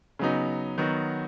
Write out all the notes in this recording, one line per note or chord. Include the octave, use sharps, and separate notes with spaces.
C#3 F#3 B3 D#4
D#3 F#3 B3 D#4 F#4